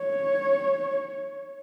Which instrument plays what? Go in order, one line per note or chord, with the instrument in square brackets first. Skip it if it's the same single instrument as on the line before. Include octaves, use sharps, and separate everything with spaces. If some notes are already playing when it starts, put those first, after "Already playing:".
Already playing: [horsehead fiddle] C#5